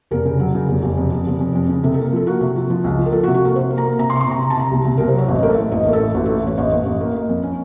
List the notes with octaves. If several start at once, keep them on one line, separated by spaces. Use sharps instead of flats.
F1 A#4
C#3
F#3
C#3
F1
F1
F2
F1
F1
F2
F2
C#3
C3 A4
A#3 A4
F3 A4
A#3 F#4
C3
F3
F3
C#2
F3
A#4
F3 A4
F#4
C3
F#4
A#3 A4
C3 C5
A#3
A#5
A#3
C3 A#5
C6
C3 C#6
C6
C3 A#5
C3 A#5
A5
C3 A#5
C2
C2
C2 A#4
C5
F#3 C#5
A1 D#5
A3 A#4
A4
A2
A1 D#5
A1 A#4
A4
A2
A1 F#4
A3 A4
A1 C#5
A1 D#5
A1
A1
A#3
A#3
F2
C#4